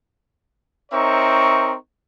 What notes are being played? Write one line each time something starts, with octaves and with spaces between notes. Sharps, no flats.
C4 D#4 A#4 C#5 E5 C#6